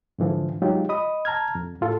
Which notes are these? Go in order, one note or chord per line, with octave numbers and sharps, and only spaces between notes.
G#2 D3 E3 F3
F#3 G#3 D#4 F4 G4
D#5 B5 D#6
A5 A#5 F6 G#6
F2
A2 F4 A4